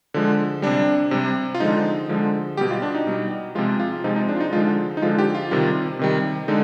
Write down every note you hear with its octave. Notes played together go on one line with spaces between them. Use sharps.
D3 F3 G#3
C3 G3 D4
C3 G3
F4
D3 F3 G#3 D#4
D3 F3 G#3
B2 G3 G4
F4
D4
D#4
B2 G3
C3 F3 G#3 F4
F4
C3 F3 G#3 D#4
D#4
D4
F4
D#4
D3 F3 G#3 F4
D#4
D3 F3 G#3 F4
G4
F4
C3 D#3 G3
C3 D#3 G3
D3 G#3 D#4